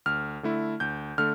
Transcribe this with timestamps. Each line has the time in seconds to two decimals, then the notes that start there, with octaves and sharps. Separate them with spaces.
0.06 D2 F6
0.43 D3 A3 E4
0.80 D2 G6
1.18 D3 A3 F6